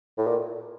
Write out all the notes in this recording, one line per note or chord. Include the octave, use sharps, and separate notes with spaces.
A2
A#2